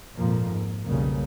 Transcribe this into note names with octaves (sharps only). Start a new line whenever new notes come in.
G#1 F2 A#2 F3 A#3
G#2
B1 F2 C#3 G3 A#3